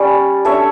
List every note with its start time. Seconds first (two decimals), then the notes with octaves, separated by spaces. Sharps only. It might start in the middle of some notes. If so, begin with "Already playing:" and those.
Already playing: G3 C#4 G4 D5
0.45 D4 A4 C#5 E5